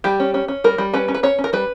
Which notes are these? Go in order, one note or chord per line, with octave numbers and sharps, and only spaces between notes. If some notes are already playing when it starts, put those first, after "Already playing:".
G3 G4
C#4
C#4
C#4
G3 A#4
G3
C#4 B4
C#4
B4
C#4 C#5
C#4
A#4
G3 B4